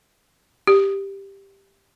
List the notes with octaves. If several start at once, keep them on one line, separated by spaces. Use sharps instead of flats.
G4